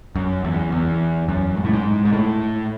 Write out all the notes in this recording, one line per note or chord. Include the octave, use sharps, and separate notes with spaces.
F#2
E2
E2
F#2
G#2
A2
G#2
G#2
A2